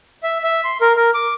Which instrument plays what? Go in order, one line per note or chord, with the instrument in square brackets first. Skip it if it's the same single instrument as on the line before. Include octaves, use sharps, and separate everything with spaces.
[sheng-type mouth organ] E5
E5
C6
A#4
A#4
D6